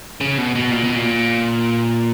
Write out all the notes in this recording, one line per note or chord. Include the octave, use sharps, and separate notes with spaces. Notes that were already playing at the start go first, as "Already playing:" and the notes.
C#3
B2
B2
A#2
B2
A#2